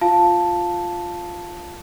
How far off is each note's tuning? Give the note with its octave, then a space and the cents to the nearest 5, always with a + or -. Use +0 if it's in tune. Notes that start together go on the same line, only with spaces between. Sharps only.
F4 +0 F5 +0 A5 +0